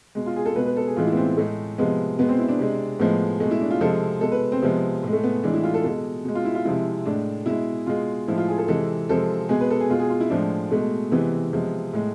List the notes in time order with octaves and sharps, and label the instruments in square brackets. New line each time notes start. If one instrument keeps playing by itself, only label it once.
[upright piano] B2 G#3
F4
G#4
A4
B2 G#3 B4
B4
A4
G#4
A2 E3 G#3 F4
E4
B3
C4
A2 G#3 A3
C3 F3 G#3 B3
B2 G#3 B3
C4
E4
D4
C3 G#3
A2 F3 G#3 B3
B2 G#3 A3
E4
D4
F4
C3 F3 G#3 A4
B2 G#3 A4
B4
C4
C3 F3 G#3 B3
A2 G#3
A3
B3
A2 E3 G#3 D4
E4
F4
A4
B2 G#3 A4
B2 G#3
F4
E4
F4
C3 F3 G#3 E4
A2 G#3 D4
B2 G#3 E4
B2 G#3 F4
A2 F3 G#3 E4
F4
G#4
A4
C3 E3 G#3 A4
C3 F3 G#3 A4
B2 G#3 G#4
B4
A4
G#4
B2 G#3 F4
G#4
F4
E4
A2 F3 G#3 D4
B2 G#3 A3
C3 E3 G#3 B3
C3 F3 G#3
A2 G#3